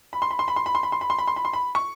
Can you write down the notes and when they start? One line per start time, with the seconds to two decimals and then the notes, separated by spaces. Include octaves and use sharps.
0.13 B5
0.22 C6
0.31 B5
0.39 C6
0.48 B5
0.56 C6
0.66 B5
0.75 C6
0.83 B5
0.92 C6
1.01 B5
1.10 C6
1.19 B5
1.28 C6
1.36 B5
1.45 C6
1.53 B5
1.75 C#6